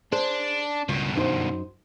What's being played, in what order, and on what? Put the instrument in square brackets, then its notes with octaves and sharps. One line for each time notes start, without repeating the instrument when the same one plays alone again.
[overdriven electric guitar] D4 [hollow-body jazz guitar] G#4 C5
[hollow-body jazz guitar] C#2 [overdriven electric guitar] G2 B2
[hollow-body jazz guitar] F#2 D#4 C5